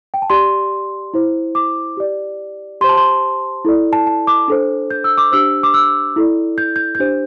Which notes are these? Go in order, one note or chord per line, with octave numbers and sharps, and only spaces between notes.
G5
A5
G4 D5 C6
E4 C5
D6
G4 D5
G4 C5 C6
A5
C6
E4 A4 D5
A5
A5
D6
D4 A4 C5
G6
E6
D6
D4 G4 C5 E6
D6
E6
E4 A4 D5
G6
G6
G6
D4 G4 C5